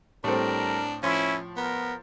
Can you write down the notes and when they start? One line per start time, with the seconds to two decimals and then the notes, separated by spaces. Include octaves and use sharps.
0.24 A2 G3 C4 D4 A4 A#4
1.03 F3 C#4 E4 C6 B6
1.56 B3 A#4